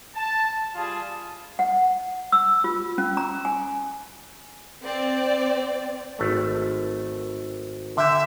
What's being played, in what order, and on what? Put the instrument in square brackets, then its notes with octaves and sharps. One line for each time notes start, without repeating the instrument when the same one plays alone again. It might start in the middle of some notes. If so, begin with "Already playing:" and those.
[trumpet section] A5
G3 F4 G#4 A5
[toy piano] F#5
E6
F4
C#4
A#5
G#5
[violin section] C4 D5
[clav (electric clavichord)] G#1 A3
[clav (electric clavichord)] D3 G5 [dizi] E5